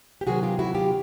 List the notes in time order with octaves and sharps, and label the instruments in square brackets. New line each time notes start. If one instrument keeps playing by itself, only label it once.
[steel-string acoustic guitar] G4
C3 D#3 F#3 B3 F#4 G#4
F4 G4
E4 F#4
F4 G4